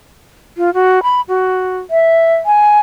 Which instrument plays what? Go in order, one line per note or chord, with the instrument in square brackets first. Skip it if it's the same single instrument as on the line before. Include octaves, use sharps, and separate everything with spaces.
[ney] F4
F#4
B5
F#4
E5
G#5